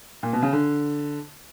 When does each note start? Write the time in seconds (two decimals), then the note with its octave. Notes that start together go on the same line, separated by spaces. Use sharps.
0.23 A#2
0.33 B2
0.42 C#3
0.53 D3